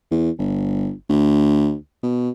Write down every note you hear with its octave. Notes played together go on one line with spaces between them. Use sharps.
E2
G1
D2
B2